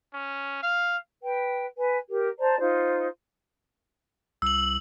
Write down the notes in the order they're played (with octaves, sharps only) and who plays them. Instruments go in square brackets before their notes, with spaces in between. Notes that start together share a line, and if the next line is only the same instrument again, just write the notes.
[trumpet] C#4
F5
[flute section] B4 G5
B4 G#5
G4 A#4
C5 D5 A5 A#5
D#4 F4 C5
[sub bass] C2 [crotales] E6 F#7